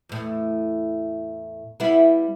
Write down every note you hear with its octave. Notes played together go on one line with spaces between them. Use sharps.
E2 A2
G3 B3 E4